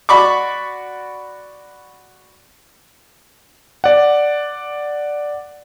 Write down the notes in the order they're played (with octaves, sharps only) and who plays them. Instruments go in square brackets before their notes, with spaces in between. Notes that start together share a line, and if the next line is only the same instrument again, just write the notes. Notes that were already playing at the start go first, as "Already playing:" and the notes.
[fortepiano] F#4 D5 B5 C#6 D6
[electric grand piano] D5 F#5